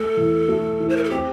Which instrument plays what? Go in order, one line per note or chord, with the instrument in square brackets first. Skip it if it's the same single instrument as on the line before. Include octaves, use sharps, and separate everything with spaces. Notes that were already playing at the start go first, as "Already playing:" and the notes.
Already playing: [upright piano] A3 [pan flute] A4
[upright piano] E2
A3
E3
[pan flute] C5
A#4
A4
[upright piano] C4 [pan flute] G4